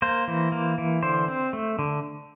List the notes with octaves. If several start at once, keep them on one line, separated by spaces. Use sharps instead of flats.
A#3 C5
E3
A#3
E3
D3 C5
C4
A3
D3